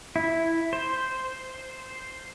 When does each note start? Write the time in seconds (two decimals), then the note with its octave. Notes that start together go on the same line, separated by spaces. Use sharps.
0.16 E4
0.73 C5